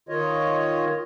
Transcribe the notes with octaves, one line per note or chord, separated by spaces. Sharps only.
D#3 F4 C#5 D#5